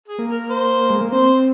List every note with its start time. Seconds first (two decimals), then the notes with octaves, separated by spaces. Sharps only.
0.08 G#4
0.19 A#3
0.30 A#4
0.50 C5
0.90 G#3
1.01 A#3
1.12 C4 C5